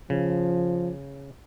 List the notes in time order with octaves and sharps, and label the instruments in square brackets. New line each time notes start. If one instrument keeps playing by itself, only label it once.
[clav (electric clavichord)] C#3 [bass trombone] F3